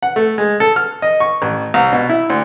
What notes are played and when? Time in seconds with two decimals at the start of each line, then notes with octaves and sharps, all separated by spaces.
0.02 F#5
0.16 A3
0.38 G#3
0.60 A4
0.76 F6
1.02 D#5
1.20 C#6
1.42 A1
1.74 C2
1.93 B2
2.09 E4
2.30 D2